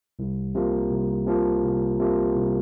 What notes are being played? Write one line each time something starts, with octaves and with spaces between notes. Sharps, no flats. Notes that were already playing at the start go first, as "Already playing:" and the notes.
C2
C3 F3 A#3
C2
C3 F3 A#3
C2
C3 F3 A#3
C2